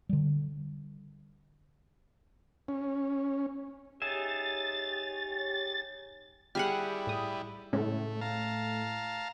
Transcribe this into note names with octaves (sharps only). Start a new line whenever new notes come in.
D3 G3
C#4
D#4 G4 G#4 C#5 E5 A6
G3 E4 G4 G#4 F#5 F6
A2 D#6
A2 C#3 G#3 A3 C#4
F5 A5 A#5